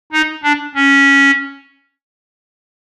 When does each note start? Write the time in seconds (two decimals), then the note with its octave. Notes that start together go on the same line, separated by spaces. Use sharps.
0.12 D#4
0.43 D4
0.75 C#4